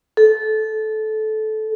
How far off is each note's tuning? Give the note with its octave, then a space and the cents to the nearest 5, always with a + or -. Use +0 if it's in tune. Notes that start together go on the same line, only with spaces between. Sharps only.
A4 -20